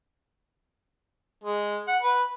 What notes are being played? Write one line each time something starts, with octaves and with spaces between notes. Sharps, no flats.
G#3
F#5
B4